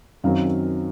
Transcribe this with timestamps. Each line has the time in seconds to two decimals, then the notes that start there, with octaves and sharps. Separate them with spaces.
0.24 F#2 D#3 F#3 C4 F5